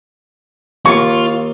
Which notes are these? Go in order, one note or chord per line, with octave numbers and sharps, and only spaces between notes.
D#2 F4 C#6